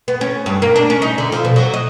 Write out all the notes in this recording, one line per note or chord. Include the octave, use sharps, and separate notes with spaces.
B3
C#4
G2
A#3
D4
C#4
D#4
D3
F3
B2
F#3
D#5